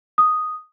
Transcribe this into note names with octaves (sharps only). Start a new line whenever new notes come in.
D#6